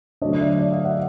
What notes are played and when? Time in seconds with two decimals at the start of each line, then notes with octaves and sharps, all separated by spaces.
0.22 D3 F#3 A3 D4 C#5 D#5
0.32 D#5
0.41 D5 E5
0.59 D5 E5
0.72 D#5 F5
0.85 E5 F#5